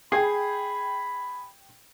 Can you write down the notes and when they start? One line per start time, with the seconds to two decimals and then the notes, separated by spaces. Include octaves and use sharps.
0.12 G#4 G5 B5 G#6 C7